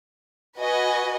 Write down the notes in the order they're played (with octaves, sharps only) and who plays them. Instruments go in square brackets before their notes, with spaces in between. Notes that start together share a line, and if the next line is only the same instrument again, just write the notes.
[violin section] F#4 B4 D#5 G#5